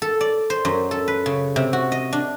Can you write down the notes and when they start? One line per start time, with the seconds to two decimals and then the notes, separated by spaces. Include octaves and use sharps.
0.02 A4
0.21 D5
0.50 C5
0.65 F#2
0.91 A4
1.08 B4
1.26 C#3
1.56 C3
1.73 F#4
1.92 D#5
2.13 D4